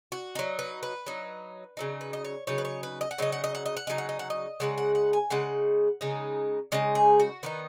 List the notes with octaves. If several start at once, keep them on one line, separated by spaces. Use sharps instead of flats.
F#4
F#3 D#4
B4
B4
F#3 D#4
C#3 F#3 D#4
B4
D#5
C#5
C#3 F#3 D#4 C#5
B4
C#5
B4
D#5
F#5
C#3 F#3 D#4 D#5
F#5
D#5
F#5
D#5
F#5
C#3 F#3 D#4 D#5
F#5
D#5
F#5
D#5
C#3 G#3 D#4 F#5
F#5
F#5
G#5
C#3 G#3 D#4 F#5
C#3 G#3 D#4
C#3 G#3 D#4 D#5
G#4
F#4
D#3 B3 D#4 B4